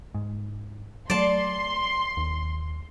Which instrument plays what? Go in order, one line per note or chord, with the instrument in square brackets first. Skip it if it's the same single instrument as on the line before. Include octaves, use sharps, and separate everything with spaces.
[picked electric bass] G#2
[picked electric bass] F#3 A3 [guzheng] D5 A5 [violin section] C6
[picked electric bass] D#2